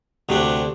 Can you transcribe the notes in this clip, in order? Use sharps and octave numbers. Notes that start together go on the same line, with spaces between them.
D2 C3 A3 D4